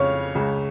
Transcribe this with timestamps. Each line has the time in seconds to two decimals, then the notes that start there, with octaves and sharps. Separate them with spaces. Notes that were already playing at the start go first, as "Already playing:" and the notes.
Already playing: F2 C#3 C#5 F5
0.35 C#2 C#3